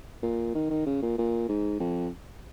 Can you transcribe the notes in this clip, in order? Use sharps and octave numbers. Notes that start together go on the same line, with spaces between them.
A#2
D#3
D#3
C#3
A#2
A#2
G#2
F2